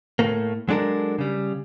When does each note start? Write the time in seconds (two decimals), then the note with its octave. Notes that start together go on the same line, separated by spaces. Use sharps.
0.19 A2 A3 A#3
0.69 F#3 G#3 D4 A4 A#4
1.19 C#3 G3